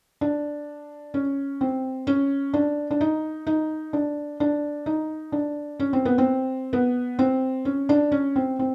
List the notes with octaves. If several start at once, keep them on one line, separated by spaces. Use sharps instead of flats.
D4
C#4
C4
C#4
D4
D4
D#4
D#4
D4
D4
D#4
D4
C#4
C4
B3
C4
B3
C4
C#4
D4
C#4
C4
C4